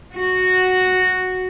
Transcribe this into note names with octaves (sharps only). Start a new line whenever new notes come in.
F#4